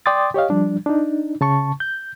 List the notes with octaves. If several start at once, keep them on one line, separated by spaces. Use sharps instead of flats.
D5 G5 C6 D6 D#6 A6
G4 C#5 D#5 F5
F3 G3 D4
D4 D#4
C#3 A5 C#6
G6